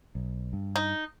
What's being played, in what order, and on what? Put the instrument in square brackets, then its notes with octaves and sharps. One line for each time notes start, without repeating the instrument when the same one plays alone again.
[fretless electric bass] B1
G2
[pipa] D#4